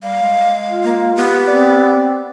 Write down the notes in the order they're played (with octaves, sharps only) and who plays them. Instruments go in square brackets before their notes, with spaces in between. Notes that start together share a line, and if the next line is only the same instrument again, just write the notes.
[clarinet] G3 [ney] F5
[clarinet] G#3
[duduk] F4
[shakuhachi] A#3
[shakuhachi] B3 [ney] G4
[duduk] C4 [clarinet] D5